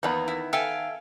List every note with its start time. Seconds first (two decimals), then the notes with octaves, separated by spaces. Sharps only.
0.03 E2 D#3 A#3 B3 B5
0.28 E4
0.53 A4 E5 F5 G5 G#5